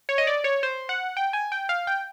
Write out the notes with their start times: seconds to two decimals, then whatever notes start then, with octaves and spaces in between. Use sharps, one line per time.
0.09 C#5
0.18 D#5
0.27 D5
0.44 C#5
0.63 C5
0.89 F#5
1.17 G5
1.33 G#5
1.52 G5
1.69 F5
1.87 G5